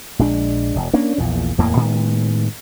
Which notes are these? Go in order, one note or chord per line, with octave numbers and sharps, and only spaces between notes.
A#1 G#3 D4
E1
A#3 C#4 D4
A#1 E2 A#2
D1 E2 A2 A#3
A2 D#3 G#3 B3